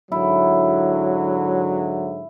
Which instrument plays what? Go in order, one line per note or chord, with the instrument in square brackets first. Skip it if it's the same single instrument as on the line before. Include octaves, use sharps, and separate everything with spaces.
[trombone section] G#2 D3 F#3 [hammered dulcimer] E4